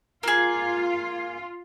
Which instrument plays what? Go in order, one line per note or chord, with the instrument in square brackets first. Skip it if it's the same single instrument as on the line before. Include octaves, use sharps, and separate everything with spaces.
[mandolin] A#3 G#4 [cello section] F4